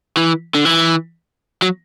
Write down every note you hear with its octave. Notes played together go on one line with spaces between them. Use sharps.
E3
D3
E3
F#3